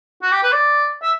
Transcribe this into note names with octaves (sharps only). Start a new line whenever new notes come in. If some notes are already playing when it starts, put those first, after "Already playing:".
F#4
G4
B4
D5
E5